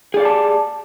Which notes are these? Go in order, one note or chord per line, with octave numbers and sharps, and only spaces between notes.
G4 G#4 D5 F5 A5